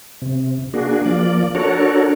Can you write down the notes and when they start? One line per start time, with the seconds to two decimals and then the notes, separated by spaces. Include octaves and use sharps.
0.22 C3
0.74 A#3 D4 F#4 G#4
1.05 F3 A#3 D5
1.55 D4 F#4 A4 A#4 C#5